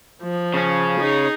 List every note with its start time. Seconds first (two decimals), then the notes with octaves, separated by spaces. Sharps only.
0.22 F3
0.54 C#3 C#4
1.00 D#4 G#4